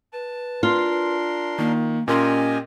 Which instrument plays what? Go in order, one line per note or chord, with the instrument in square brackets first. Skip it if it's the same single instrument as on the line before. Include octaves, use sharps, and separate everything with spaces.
[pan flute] B4 [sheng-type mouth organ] A5
[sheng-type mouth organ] D4 A#4 C6 [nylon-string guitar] F4
[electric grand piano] D#3 [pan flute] A#3
[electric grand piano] A#2 A#4 C6 [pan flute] C#4 [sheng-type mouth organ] G4 D#5 G#5